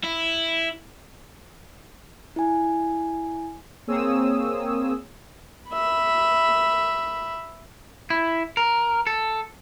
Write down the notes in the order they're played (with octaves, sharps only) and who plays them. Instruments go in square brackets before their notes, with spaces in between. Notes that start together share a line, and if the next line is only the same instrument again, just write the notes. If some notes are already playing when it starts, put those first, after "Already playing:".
[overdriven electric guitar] E4
[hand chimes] E4 G#5
[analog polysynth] A#3 C4 G#4 C#5 D#6 E6
[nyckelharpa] E5 B5
[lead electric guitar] E4
A#4
A4